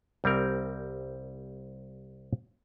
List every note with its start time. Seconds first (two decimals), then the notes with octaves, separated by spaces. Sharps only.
0.24 C2 G3 C4 A#4